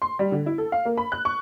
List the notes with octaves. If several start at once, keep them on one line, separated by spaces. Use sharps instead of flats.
C6
G3
D3
E4
A4
F5
A#3
B5
F#6
C#6